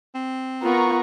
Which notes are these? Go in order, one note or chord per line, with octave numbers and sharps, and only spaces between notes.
C4
B3 F4 A#4 A#5 C#6